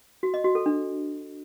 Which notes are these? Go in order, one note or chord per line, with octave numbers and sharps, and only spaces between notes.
F#4
D#5
F#4
A4
D4